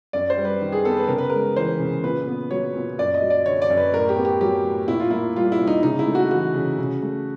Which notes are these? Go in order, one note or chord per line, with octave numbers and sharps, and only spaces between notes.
F#2 D5
C5
G3
B4
D#3
G#4
B3 A4
B4
C#3 A#4
B4
G#3 A#4
E3 C5
C#3
A#2 B4
B3
F#3 C#5
A#2
F#2 D5
D#5
F#3
D5
D3 C#5
D5
F#2
B4
A2 A#4
G4
B3
G4
F#3 G4
A2
A#2 E4
F4
A#3 E4
G3 F4
E4
A#2
D#4
C#3 D#4
E4
A3
F#4
E3 F#4
C#3
C#3
A3